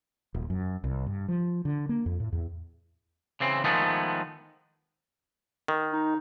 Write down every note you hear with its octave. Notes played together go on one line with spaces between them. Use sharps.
D#1
F#2
C2
G2
F3
D3
A#3
F2
A2
E2
C#3 E3 C4
D#3 F3 G#3 A3 B3
D#3
D#4